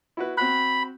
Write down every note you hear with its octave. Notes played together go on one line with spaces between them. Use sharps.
E4 F#4 B4
C4 F#4 B5 F#6